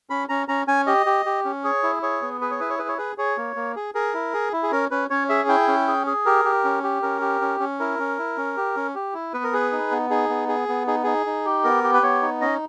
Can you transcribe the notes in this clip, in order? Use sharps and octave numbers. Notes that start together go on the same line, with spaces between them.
C#4 B5
C#4 A#5
C#4 A#5
C#4 G#5
G4 D#5
G4
G4
C#4
G#4 C#5
E4
G#4 C#5
B3
G#4 B4
C#5
E4 B4
C#5
G#4 B4
C#5
G#4 B4
G#4 C#5
A#3
A#3
G#4
G#4 A#4
E4
G#4
E4
G#4
C#4 A#4
C#4 B4
C#4 C#5
G#4 E5
E4 G5
C#4
G#4
G#4
G4 A#4
G4
C#4
G4
C#4 A#4
G4
C#4
C#4
E4 A#4
C#4
E4
C#4
G4
C#4
G4
E4
B3 B4
A#4
G#4 B4
D#4
B3
D#4 G#4
B3
G#4
B3
D#4 G#4
D#4 G#4
D#4
G4
B3 A#4
G4
B4
B3 C#5
D#4
C#4 D#5